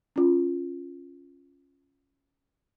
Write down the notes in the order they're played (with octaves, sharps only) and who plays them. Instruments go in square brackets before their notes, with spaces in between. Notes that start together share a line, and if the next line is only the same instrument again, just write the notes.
[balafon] C#4 F4